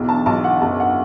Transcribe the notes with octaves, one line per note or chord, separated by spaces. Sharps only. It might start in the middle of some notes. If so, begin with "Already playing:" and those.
Already playing: B1 E2
A5
B1 A5
F#5
F#1 A5
F#5